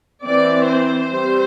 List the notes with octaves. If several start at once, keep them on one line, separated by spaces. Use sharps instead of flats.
E3 C4 D5
C5
G3 C4